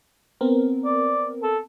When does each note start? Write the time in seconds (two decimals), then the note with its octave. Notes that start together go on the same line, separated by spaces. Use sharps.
0.41 B3 C4 A#4
0.85 D5
1.43 A4